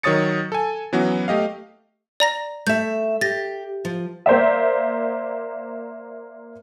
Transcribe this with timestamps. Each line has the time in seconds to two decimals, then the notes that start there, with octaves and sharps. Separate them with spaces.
0.03 D#3 F#3 C#5 D#6 A6 C#7
0.52 A4 G#5
0.93 E3 F#3 B3 C#4 F#4
1.28 A3 G4 D#5 F5
2.20 D5 A#5 A#6
2.67 A3 E5 G6
3.21 G4 A6 A#6
3.85 F3
4.26 A#3 C5 D5 E5